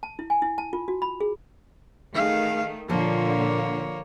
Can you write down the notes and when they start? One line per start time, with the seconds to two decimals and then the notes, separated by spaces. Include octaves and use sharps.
0.03 A5
0.19 E4
0.30 G#5
0.42 E4
0.58 A5
0.73 F4
0.88 F#4
1.02 B5
1.21 G#4
2.15 D#3 A3 G#4 F5
2.89 A#2 D3 F3 A#3 F4 C#5